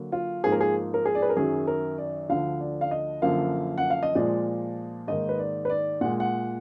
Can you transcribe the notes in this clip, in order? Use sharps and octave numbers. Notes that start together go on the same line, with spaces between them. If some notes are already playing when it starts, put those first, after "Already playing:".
Already playing: D3 F#3 A#3
F4
G#2 F3 A#3 G#4
A#4
G#4
A#4
G#4
D5
B4
A#4
F#2 D#3 F#3 G#4
A#4
D5
D2 D3 F3 F5
D5
F5
D#5
F#2 D3 F3 A#3 F5
F#5
F5
D#5
A#2 F3 G#3 D5
G#2 D#3 A#3 D#5
B4
D5
B4
D5
A#2 G#3 F#5
F#5